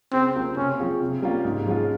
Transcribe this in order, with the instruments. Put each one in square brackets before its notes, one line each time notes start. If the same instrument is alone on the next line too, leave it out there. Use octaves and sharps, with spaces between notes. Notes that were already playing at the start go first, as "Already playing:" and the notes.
[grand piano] C#3 [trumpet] C4
[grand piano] G3 A#3 F4
[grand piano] C3 [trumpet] C#4
[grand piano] F3 C4 F4 G#4
C3
G3 A#3 C#4 F4
G#2
F3 G#3 C#4 F4